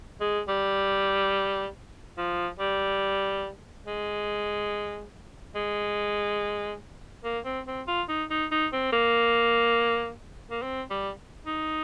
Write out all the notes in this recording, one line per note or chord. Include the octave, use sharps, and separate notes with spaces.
G#3
G3
F3
G3
G#3
G#3
A#3
C4
C4
F4
D#4
D#4
D#4
C4
A#3
A#3
C4
G3
D#4